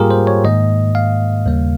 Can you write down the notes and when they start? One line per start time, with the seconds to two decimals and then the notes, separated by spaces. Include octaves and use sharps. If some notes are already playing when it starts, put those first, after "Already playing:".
Already playing: G#2 G3 A#3 F4 G4 G#4 A#4
0.11 C5
0.27 C#5
0.44 G#2 D#3 A#3 D#5
0.95 F5
1.46 D#2 C#3 G3 A#3